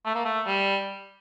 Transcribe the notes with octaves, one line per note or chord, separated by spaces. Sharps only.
A3
A#3
A3
G3